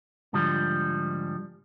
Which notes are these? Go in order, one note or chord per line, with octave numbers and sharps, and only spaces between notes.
G#2 D3 F3 G3